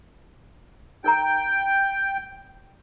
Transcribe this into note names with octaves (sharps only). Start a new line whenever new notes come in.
D#4 A#4 G5 A#5